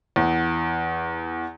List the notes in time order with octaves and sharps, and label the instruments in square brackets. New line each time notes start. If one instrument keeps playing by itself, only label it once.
[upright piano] E2